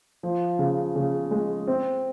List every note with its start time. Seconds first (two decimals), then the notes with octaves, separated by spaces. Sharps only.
0.23 F3
0.59 C#3
0.95 C#3
1.31 G#3
1.67 C4